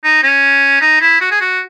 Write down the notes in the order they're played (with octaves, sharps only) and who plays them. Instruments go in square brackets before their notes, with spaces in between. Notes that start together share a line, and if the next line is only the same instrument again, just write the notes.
[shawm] D#4
C#4
D#4
E4
F#4
G#4
F#4